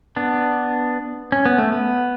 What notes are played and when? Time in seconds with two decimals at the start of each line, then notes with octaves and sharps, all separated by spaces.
0.16 B3 D4
1.32 C#4
1.45 B3
1.58 A3
1.72 B3